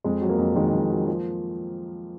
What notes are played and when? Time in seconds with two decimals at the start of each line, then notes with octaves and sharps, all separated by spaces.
0.04 F2 G#3
0.21 F#3
0.29 A#3
0.38 F2
0.55 D#3 G#3
0.73 F2
0.81 A#3
0.89 F#3
1.07 F3